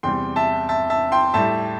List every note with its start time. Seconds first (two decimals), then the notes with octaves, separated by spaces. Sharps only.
0.03 E2 C3 G3 G5 C6
0.36 E5 A5
0.69 E5 A5
0.90 E5 A5
1.12 G5 C6
1.34 A2 G3 E5 A5